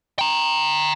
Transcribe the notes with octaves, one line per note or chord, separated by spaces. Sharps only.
G5 A#5